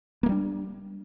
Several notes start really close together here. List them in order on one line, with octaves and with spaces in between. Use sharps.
A#3 A3 G3 D4